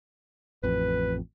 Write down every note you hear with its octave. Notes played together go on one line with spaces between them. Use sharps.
A1 F2 B4